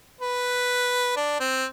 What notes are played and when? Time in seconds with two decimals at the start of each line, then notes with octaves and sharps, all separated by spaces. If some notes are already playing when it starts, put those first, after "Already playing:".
0.21 B4
1.16 D4
1.40 C4